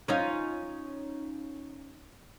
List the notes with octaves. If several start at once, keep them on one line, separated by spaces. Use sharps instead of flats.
C#4 D#4 F4